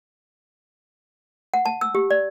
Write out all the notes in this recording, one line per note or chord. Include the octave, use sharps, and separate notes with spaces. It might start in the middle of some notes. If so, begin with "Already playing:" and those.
F#5
A5
E6
G4
D5